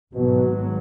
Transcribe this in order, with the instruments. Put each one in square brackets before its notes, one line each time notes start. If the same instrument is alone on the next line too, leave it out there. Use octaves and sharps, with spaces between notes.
[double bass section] G#1 G#2 F#3 [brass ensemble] B2